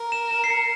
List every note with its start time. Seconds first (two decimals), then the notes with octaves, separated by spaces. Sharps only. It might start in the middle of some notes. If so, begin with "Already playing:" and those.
Already playing: A#4
0.12 E7
0.31 E7
0.44 C7
0.50 C#7